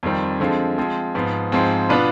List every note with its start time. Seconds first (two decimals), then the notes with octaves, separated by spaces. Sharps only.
0.03 F2 D#3 G3 C4
0.40 D3 F3 G#3 C4
0.78 F3 G#3 C4
1.15 G#2 F3 B3
1.52 G#2 F3 G#3 C4
1.89 B2 B3 D4 F4 B4